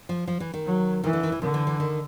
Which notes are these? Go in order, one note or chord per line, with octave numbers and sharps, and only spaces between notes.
F3
F3
E3
D#3
F#3
D#3 E3
D3
D#3
E3
D3 D#3
E3
E3
D#3